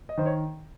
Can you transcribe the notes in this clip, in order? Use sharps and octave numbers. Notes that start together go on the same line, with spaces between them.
D#5
D#3 C5
C#5